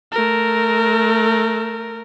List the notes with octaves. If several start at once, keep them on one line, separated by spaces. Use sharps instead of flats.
A3 A#4